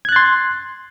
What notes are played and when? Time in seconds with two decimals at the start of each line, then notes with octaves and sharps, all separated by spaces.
0.05 G#6
0.09 F#6
0.12 A6
0.16 C6